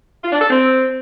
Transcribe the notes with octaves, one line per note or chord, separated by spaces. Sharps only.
F4
D4
A4
C4